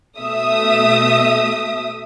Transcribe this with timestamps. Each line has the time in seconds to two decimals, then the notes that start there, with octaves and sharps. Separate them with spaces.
0.19 B2 A3 E5 D#6